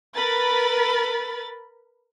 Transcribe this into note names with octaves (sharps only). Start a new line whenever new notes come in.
A#4 B4 B5 A6